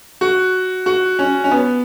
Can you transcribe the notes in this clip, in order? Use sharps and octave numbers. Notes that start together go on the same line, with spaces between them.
F#4
F#4
C#4
C#4
B3